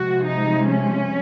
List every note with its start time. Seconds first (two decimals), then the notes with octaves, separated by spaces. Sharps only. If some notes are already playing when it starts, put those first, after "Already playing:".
Already playing: C3 F3 G#3 F#4
0.26 D#4
0.68 C#4